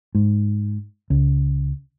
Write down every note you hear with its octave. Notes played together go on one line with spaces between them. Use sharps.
G#2
C#2